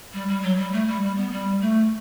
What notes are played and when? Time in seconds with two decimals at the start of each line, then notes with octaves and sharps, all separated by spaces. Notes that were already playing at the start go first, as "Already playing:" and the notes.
0.14 G3
0.28 G3
0.43 F#3
0.58 G3
0.73 A3
0.87 G3
1.02 G3
1.17 B3
1.31 G3
1.61 A3